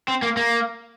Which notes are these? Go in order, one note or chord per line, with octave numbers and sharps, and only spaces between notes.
C4
A#3
A#3